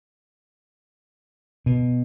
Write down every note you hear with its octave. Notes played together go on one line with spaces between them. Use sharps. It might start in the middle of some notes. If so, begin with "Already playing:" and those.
B2